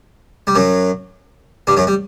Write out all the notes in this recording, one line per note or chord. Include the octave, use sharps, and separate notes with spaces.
G3
F#2 F#3
G2 G3
F#2 F#3
G3